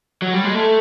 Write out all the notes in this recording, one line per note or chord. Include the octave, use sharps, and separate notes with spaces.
F#3
G3
G#3
A3